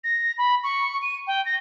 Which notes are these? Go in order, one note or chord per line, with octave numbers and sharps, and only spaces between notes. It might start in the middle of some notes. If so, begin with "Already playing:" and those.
A#6
B5
C#6
D#7
G5
A#6